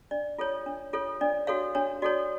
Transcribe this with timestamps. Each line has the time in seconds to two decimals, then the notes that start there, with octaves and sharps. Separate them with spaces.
0.11 D4 D5
0.39 F4 A4 C#5
0.66 D4
0.93 F4 A4 C#5
1.21 D4 D5
1.47 F#4 A4 C#5 F5
1.75 D4 C#5
2.02 F#4 A4 C#5 D5